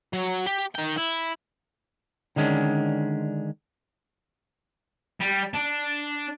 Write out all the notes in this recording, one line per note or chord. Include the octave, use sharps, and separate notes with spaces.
F#3
G4
D#3 G5
E4
D3 D#3 G#3 C#4 D4
G3
D4